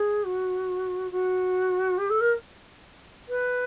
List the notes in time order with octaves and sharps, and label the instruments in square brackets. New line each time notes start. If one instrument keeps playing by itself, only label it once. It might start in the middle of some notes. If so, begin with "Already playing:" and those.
Already playing: [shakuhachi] G#4
F#4
F#4
G4
A4
A#4
B4